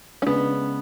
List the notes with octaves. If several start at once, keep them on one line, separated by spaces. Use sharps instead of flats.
C#4
C#3 G#3 B3 D4